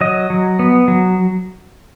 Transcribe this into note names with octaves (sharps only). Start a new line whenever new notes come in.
F#3 D#5
F#3
B3
F#3